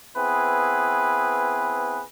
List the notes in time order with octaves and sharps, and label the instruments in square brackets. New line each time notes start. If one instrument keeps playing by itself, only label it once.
[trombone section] B3 C4 E4 G#4 B4